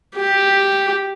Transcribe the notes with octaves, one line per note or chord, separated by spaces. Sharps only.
G4